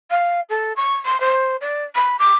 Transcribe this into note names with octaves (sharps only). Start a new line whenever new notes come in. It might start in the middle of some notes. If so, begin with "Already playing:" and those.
F5
A4
C#6
C6
C5
D5
B5
D6